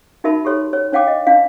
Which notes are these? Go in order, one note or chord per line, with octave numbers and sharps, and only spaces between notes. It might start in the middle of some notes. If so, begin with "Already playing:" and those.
D#4 F#4 A#4 E5 A5 B5
G4 A4 C#5 C6
C#5
D4 C#5 F5 G5 D6
D#5
D4 E4 F5